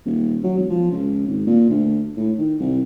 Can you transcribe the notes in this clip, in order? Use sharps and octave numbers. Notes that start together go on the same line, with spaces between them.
D#1
F#3
E1
F3
C#2
G#1
A#2
D2
A2
D#3
C2